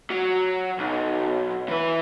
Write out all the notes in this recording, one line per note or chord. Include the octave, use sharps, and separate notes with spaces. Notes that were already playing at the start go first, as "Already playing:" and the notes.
F#3
B1
E3 B4